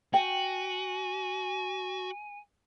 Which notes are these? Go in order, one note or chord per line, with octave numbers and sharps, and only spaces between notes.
F#4 G5 G#5